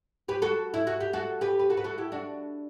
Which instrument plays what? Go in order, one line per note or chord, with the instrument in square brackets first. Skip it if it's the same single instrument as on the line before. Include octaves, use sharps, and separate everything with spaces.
[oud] G4 B4
F#4 A4
E4
F#4
G4
F#4 A4
G4 B4
B4
F#4 A4
B4
F#4 A4
E4 G4
D4 F#4